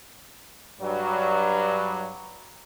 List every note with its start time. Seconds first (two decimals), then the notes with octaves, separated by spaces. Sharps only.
0.80 G2 F#3